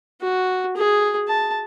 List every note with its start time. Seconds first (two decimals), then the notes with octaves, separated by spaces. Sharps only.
0.20 F#4
0.76 G#4
1.28 A5